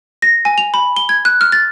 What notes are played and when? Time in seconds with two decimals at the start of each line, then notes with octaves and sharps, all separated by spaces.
0.22 A#6
0.45 G#5
0.58 F7
0.74 B5
0.97 G7
1.09 G#6
1.25 F#6
1.41 F6
1.52 A6